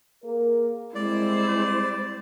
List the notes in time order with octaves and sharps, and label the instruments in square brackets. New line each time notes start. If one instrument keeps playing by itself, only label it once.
[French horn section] A#3 G#4 A#4
[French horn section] G3 C4 [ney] G#3 [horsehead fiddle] E4 C5 [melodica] D5